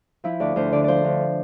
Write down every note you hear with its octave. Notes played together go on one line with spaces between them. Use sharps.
F3 E4
D2 D5
D2 C5
D3 D5
F3 C5 D5
D2